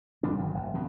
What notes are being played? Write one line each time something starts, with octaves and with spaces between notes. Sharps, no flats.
D#1 G2 C#3 D4
G1 D#3 F#3
F1
F2 B2 D3